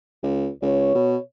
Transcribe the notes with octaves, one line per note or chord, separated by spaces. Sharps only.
C#2
C#2 C#5
B2